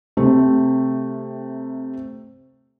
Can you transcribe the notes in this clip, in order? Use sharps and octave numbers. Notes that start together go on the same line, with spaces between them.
C3 A3 C4